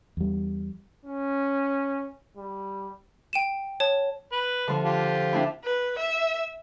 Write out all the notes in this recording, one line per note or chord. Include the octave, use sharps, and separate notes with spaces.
E2 G3
C#4
G3
G5 D#7 E7
C#5 A5
B4
D3 F3
F4 G4
C4 D4 E4
B4
E5